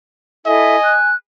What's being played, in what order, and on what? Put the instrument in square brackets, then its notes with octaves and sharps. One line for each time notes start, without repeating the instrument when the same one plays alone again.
[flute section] E4 A4 E5 [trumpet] D#5 [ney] G#5
[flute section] F#6